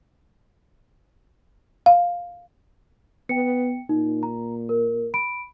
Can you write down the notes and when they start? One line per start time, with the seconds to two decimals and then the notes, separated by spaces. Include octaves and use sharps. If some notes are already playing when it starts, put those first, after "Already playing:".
1.86 F5
3.29 B3 G5 C#7
3.89 A#2 D#4
4.23 A#5
4.69 A#4
5.14 B5 D7